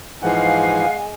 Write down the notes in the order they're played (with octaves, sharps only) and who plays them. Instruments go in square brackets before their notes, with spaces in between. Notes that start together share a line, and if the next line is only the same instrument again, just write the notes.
[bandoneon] G#2 E3 F3 [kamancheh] G#3 G#5 [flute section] F5 [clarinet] F#5